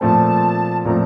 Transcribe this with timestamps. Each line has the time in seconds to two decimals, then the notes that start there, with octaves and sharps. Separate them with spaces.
0.01 A#2 F3 A3 C4 A5
0.85 A#2 F3 A3 C4 A#5